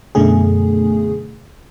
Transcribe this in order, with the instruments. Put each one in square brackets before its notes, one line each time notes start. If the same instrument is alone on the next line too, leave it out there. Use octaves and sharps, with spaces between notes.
[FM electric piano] F#2 B2 D3 A3 G#4